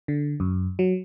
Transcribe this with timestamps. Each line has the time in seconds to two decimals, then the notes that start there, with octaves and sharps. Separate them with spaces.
0.08 D3
0.40 F#2
0.79 F#3